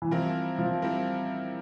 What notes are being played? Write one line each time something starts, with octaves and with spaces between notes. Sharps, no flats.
E3
F3 G3 C4 E4 A#4
F3
G3 C4 E4 A#4